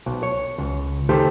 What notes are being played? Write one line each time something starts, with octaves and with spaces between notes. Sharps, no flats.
B1
C#5
C#2
D#3 A3 G4 C5